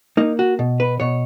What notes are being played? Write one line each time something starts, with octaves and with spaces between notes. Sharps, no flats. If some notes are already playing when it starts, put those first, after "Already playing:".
A#3 D#4
F#4
B2
B4
B2 C#5